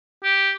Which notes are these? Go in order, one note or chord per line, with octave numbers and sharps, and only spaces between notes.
G4